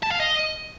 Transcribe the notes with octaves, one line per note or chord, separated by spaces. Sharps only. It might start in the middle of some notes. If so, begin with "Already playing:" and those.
A5
F5
D#5